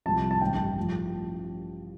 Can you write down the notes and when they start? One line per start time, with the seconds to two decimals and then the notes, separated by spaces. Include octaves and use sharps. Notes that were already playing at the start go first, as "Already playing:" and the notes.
0.06 C2 C3 F3 A5
0.31 A5
0.41 A1 G2 D#3 G5
0.79 A2 F3